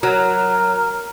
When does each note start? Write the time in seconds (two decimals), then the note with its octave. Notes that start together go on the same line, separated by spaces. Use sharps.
0.03 F#3 A#4